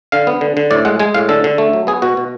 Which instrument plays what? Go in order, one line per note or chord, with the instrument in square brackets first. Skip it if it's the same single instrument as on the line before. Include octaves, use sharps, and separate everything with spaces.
[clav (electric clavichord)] D3 F5
B3
D3
D3
A2 D5
G#3 F#5
G#3 G#5
A2 F5
D3 A4
D3
A3
F#3
B3 G#4
B2 F#4
B2